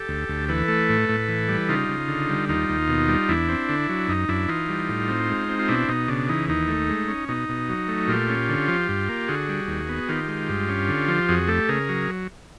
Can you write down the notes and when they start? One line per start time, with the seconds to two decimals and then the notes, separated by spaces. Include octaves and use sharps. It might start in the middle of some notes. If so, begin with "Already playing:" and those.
Already playing: G4 A4
0.08 D2
0.29 D2
0.49 E3 A4 B4
0.68 A3
0.89 A2
1.09 A2
1.28 E3
1.48 G3
1.69 C#3 D#4 F4
1.89 C#3
2.08 D3
2.29 G3
2.49 D#2 D#4 F4
2.69 D#2
2.89 B2
3.08 G3
3.29 E2 D4 E4
3.49 C4
3.69 D3
3.89 F#3
4.08 F#2 D#4
4.29 F#2 D4 E4
4.48 E3 D#4 F4
4.69 G3
4.89 A2
5.08 C4
5.29 G#3
5.48 C4
5.59 F4
5.68 B2 D4 E4
5.88 B2 D#4
6.08 C#3 D4
6.29 E3 D#4
6.48 D#2 D#4
6.68 A3
6.89 G#3
7.08 C#4
7.28 B2 D#4
7.49 B2
7.69 F#3
7.88 A3
8.08 A#2 F4 G4
8.29 C#4
8.49 D3
8.68 F3
8.89 G2
9.09 A#3
9.28 D3 F#4 G#4
9.49 G3
9.68 D#2
9.89 B3
10.08 D#3 F4 G4
10.28 G#3
10.49 G2
10.69 C#4
10.89 D3
11.08 F3
11.29 F2 F#4 G#4
11.48 A3 G4 A4
11.69 C#3 G#4 A#4
11.89 F#3